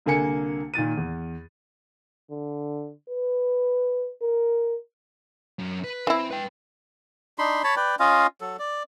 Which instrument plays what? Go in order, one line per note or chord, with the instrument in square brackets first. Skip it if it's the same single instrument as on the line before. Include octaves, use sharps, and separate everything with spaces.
[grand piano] C2 D3 A#3 G#5 C#7
A#2 D#3 A6 D#7
E2
[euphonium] D3
B4
A#4
[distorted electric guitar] F#2
B4
[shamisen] E3 E4 [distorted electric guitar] C4
[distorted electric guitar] B4 G5
[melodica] D4 D#4 B5 C6
C#5 A5 B5
B4 D5 G5
C#4 F4 D#5 F5
F#3 A4
D5